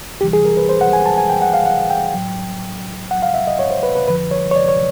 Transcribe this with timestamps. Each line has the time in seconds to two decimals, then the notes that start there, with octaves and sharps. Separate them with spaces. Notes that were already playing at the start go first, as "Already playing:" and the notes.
0.21 D2 C3 E3 G3 G4
0.33 G#4
0.45 A#4
0.57 B4
0.69 C5
0.81 F#5
0.93 G#5
1.06 A5
1.18 G#5
1.30 G5
1.42 F#5
1.54 F5
1.66 F#5
1.90 G5
2.14 A2 F#3
3.11 F#5
3.23 F5
3.34 E5
3.47 D#5
3.59 C#5
3.71 C5
3.83 B4
3.95 B4
4.07 F2 D3 F3 B4
4.31 C#5
4.51 C#5
4.56 D5
4.69 C#5